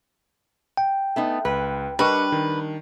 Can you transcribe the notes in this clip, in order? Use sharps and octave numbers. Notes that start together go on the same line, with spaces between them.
G5
A3 B3 D#4
C#2 B4
G3 D4 A#4 B4 D#5 C#6
D#3